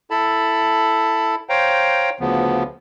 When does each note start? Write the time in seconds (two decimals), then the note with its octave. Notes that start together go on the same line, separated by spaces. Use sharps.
0.10 E4 A4 A5 B5
1.49 C5 C#5 F5 G5 A#5
2.20 D2 C#3 F3 B3